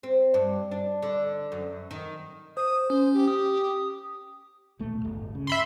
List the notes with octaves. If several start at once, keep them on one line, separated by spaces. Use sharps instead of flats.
C4
G2
D4
D3
F#2
D#3
C5 D#6
C#4 C5
G4
D#6
D#1 B1 A3
D1 G1
C#3
E5 B5 C6